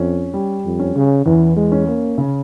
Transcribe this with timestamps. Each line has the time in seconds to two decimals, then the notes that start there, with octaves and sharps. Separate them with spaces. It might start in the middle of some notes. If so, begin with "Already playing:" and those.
Already playing: F2 C#4
0.34 G3
0.64 F2
0.79 C#4
0.95 C#3
1.26 E2 E3
1.57 G#3
1.72 C#4
1.87 A#3
2.18 C#3